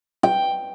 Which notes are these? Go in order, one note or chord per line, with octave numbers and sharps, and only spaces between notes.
G5